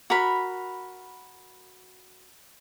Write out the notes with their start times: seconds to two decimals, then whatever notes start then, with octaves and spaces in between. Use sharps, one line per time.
0.10 F#4 A#4 B5